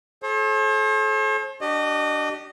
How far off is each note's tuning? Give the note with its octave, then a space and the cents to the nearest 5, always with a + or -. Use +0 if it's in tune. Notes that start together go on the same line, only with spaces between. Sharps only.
A4 -40 C5 +45
D4 +0 G4 -40 D#5 -25